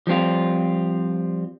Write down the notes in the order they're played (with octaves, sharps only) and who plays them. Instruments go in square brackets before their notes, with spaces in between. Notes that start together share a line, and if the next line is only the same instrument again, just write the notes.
[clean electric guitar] F3 G3 C4 F4